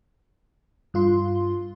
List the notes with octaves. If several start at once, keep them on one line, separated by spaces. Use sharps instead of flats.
G2 F4 C6